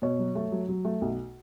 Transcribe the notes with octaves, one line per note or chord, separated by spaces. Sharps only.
B2 C#5
F#3
A3
F#3
F#3
A3
B1